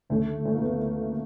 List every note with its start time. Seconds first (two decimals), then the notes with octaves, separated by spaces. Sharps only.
0.09 D2 C#3 F#3 A3
0.45 A3
0.54 A#3
0.61 B3